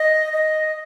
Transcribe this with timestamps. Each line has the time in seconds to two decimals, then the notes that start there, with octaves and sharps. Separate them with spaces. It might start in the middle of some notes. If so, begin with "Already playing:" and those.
Already playing: D#5
0.33 D#5